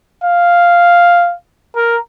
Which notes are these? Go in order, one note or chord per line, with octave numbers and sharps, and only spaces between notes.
F5
A#4